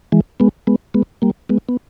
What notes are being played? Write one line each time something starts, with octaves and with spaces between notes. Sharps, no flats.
E3 G#3
G#3 B3
G#3 B3
G#3 B3
G3 A#3
G#3 B3
B3